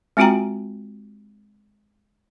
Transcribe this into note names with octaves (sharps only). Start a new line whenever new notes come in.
G#3 C4 F4 F#4 G5 A#5